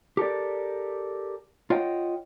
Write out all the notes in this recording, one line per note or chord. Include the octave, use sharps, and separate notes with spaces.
G4 A4 A#4 D5
F4 C#5 D#5 F#5 G5